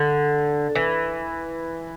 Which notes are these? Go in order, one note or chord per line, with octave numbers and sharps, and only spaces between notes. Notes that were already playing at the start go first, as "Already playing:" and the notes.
Already playing: D3
E3